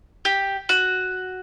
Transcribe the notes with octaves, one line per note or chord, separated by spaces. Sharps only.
G4
F#4